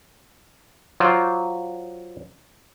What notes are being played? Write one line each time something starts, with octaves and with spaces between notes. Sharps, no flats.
F#3 F4 C5 D5